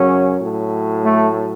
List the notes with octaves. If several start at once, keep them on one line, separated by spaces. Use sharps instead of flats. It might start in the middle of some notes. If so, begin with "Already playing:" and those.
Already playing: F#2 C#3 F#3 C#4
A2 F#3
A3